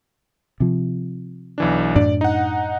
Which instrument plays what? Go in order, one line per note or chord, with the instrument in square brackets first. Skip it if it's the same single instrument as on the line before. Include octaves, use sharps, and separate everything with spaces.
[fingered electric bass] C3 F3
[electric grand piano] B1 E3 D4
[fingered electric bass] F#2 A2 D4 [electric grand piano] D5
[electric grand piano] D#4 F#5